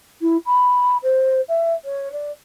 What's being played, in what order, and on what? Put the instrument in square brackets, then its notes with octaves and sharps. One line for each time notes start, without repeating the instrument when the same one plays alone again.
[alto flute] E4
B5
C5
E5
C#5
D5